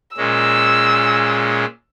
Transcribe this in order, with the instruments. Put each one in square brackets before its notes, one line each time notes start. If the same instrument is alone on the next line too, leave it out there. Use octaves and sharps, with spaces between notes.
[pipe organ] A#2 G#3 C#4 [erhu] E6